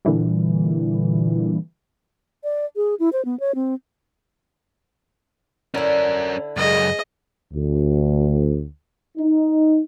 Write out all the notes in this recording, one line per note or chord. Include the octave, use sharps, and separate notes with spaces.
A#2 D3 E3 G3
D5
G#4
E4
C5
B3
C#5
C4
D3 C#4 E4 A#4
C#2 F#2 G#4 D#5
D2
D#4